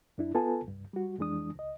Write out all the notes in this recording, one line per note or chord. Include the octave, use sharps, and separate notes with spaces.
F#2 D4 E4
B3 F4 A4 B4 G#5 A5
C2 G2
G3 F#4
F2 E3 G#3 D4 D#6
C#2 D#5